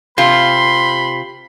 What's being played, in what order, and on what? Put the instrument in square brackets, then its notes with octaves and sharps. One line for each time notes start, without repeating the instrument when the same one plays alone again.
[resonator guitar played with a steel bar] C3 F4 [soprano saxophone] B5 [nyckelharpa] C6